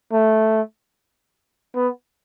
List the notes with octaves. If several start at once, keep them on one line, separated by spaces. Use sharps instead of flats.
A3
B3